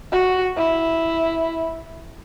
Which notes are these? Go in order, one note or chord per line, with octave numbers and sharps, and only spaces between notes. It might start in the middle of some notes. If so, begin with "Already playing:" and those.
F#4
E4